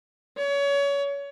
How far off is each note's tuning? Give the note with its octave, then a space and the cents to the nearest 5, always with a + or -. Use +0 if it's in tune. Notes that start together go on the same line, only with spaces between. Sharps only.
C#5 +25